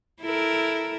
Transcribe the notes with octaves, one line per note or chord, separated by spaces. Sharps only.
E4 A4 A#4